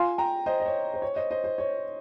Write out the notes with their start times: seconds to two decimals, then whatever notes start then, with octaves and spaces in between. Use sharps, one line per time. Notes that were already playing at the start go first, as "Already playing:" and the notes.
Already playing: F4 G#5 C6
0.18 G5 A#5
0.46 C5 D#5
0.60 D#5
0.66 C#5
0.94 C5
1.02 C#5
1.16 C5 D#5
1.31 C5 D#5
1.44 C5
1.58 C#5